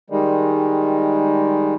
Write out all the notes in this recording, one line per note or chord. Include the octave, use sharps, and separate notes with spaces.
D#3 G3 G#3